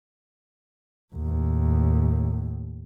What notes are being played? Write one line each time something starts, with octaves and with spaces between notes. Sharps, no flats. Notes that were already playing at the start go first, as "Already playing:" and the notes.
D#2 A2